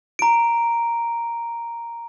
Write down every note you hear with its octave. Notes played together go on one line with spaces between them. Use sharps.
A#5 D7